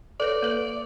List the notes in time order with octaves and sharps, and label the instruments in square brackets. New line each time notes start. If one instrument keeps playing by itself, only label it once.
[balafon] A4 B4 C#5 [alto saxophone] D5
[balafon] A#3 A4 B4